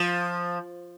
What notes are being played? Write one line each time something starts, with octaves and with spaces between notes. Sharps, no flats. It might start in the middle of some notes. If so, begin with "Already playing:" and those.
Already playing: F3